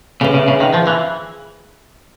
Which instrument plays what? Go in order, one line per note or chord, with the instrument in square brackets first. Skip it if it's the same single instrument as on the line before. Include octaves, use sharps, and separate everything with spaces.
[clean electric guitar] C#3 [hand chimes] G#4 B4 E5
[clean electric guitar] C#3
C#3
D#3
F3
E3